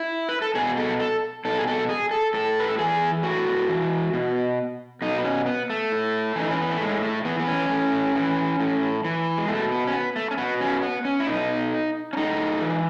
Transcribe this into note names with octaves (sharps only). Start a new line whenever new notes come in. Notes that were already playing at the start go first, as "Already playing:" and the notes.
Already playing: E4
B4
A4
B2 G#4
A4
A4
B2 A4
G#4
A4
G#4
A4
A2 A4
B4
A4
E3 G#4
A2 F#4
E3
B2
B2 D#4
B3
C#4
B3
A3
A2
E3 D#4
C#4
B3
A3
A2 G#3
A3
E3 B3
B3
C#4
A2
E3
A2
E3
G#3
B2 A3
B3
C#4
B3
A3
C#4
B2 B3
C#4
B3
C#4
E4
B2 D#4
C#4
A2 D#4
E3